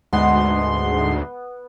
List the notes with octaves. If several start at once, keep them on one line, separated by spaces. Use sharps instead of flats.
D2 G#2 G#3 B3 C6